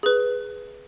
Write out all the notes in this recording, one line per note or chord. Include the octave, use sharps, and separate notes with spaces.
G#4 B4